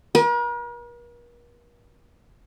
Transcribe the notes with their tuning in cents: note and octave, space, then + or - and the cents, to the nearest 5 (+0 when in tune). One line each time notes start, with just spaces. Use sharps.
A#4 +45